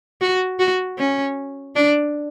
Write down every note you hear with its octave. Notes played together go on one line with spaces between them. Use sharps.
F#4
F#4
C#4
D4